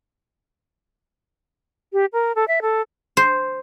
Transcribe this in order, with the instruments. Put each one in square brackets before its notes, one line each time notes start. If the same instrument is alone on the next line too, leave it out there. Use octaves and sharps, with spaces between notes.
[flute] G4
A#4
A4
E5
A4
[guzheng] C5